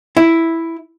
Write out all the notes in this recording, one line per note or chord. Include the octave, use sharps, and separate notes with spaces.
E4